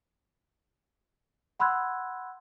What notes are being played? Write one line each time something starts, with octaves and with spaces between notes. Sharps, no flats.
F#5 B5 C6 E6 F#6 G#6